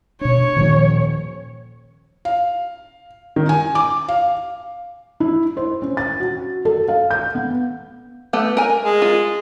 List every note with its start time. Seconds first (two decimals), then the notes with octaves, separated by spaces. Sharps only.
0.21 B2 D4 C#5
0.56 D#1 D#3 F3
2.25 F5
3.36 D#3
3.49 G#5
3.75 D6
4.08 F5
5.20 E4
5.57 C5
5.82 C#4
5.97 A6
6.20 F#4
6.65 A4
6.88 F5
7.11 G6
7.35 B3
8.33 A3 B3 G4
8.57 A#4 G#5
8.84 G#3
9.02 F4